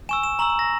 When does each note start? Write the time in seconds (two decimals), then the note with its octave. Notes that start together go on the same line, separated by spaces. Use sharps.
0.09 G#5 C#6 E6 E7
0.23 E7
0.39 A#5 C#6 E6 F#7
0.50 E7
0.59 A#6